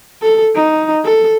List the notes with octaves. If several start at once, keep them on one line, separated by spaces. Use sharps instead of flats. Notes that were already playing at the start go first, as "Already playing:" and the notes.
A4
D#4
A4